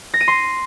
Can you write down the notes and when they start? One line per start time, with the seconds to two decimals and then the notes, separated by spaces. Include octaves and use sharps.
0.14 A#6
0.21 D#7
0.28 C6